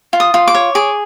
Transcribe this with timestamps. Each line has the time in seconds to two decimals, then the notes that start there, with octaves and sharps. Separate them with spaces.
0.13 F4
0.20 D#6
0.34 F4
0.48 D6
0.54 C#5
0.75 G#4 D6